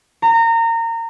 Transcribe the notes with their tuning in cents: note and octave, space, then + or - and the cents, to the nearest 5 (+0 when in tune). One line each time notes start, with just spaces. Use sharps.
A#5 -25